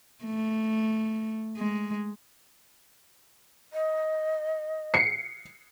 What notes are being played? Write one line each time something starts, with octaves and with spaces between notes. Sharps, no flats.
A3
G#3
D#5
C7 C#7